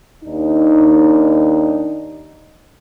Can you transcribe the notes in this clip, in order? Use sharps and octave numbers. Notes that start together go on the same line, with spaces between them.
D#2 D4 D#4